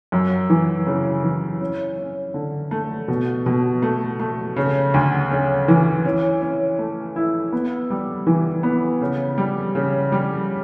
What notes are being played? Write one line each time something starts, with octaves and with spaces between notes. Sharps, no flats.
F#2
E3
C#3
E3
C#4
C#4
D3
A3
B2
B2
A3
A3
C#3
D2
C#3
E3
C#4
C#4
A3
E4
B3
G3
E3
B3
C#3
G3
C#3
G3